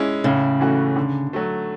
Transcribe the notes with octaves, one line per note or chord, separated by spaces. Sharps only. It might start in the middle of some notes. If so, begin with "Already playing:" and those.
Already playing: G#3 C#4 E4
A2 C#3
E3 A3 C#4 F#4
D3
F#3 A3